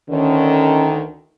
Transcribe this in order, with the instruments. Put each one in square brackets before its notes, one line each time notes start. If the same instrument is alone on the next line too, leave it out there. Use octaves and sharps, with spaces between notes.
[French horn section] D2 D3 D#3 [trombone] C#4